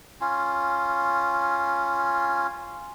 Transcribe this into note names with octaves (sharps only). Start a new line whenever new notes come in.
C#4 F4